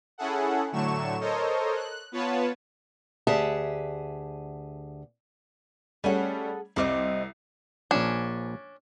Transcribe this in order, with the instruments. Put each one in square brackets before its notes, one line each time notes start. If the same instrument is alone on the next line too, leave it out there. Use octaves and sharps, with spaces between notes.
[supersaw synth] C#4 E4 G#4 A4 F#5
A2 D3 F#3 A3 C#6 E7
A4 A#4 C5 C#5 D#5
F#6
B3 F4 B4 C#5 A5
[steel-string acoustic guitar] D2 G4 G#4 E5 F#5 A5
[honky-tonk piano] G3 A3 C#4 [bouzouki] G#4 A4 F#5
[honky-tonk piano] C2 D6 [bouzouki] G3 C4 D#5
[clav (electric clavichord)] A#1 F3 [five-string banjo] C#4 D4